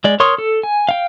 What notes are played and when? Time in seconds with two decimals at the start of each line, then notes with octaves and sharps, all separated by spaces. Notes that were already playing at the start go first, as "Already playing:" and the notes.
0.04 G#3 D5
0.20 A#4 C#5 C6 C#6 D#6
0.38 A4
0.63 G#5
0.89 F5 G5